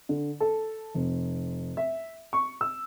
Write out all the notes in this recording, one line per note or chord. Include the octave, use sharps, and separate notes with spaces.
D3
A4
F1
E5
C#6
E6